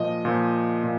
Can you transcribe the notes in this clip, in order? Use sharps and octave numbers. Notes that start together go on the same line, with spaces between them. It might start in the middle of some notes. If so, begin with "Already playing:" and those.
Already playing: A#2 F3 D#5
A#2 F3
A#2